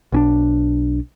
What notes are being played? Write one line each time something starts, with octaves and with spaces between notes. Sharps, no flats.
B1 C#4 D4